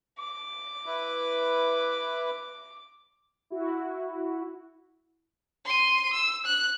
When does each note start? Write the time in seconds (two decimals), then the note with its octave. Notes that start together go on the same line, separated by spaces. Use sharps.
0.18 D6
0.86 E4 B4
3.50 E4 F#4
5.65 C6 D#7
6.13 E6
6.46 F#6